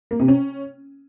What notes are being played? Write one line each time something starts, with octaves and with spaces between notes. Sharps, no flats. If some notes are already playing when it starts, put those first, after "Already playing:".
A#3
C3
C#4